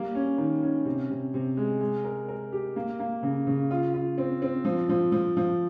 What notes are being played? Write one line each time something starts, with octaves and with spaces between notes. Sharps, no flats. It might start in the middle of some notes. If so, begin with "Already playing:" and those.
Already playing: G3 A#3
C#4
D#3
C#4
C3
C3
C3
G#3
G#3
A#4
A#4
G4
A#3
A#3
C#3
C#3
F4
F4
C4
C4
F3
F3
F3
F3